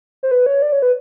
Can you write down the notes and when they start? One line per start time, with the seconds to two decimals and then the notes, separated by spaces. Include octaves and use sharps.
0.23 C5
0.31 B4
0.46 C#5
0.62 D5
0.72 C#5
0.82 B4